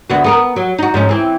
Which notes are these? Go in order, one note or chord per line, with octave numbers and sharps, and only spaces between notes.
D2 B3 F#4
B3 A4 A#4
F#3
D#4 F#4
G#2 F3 C#4
E3 C4